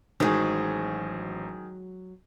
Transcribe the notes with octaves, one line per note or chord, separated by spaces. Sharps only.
A1 D#3 F#3 G#3 G#4 C5 A#5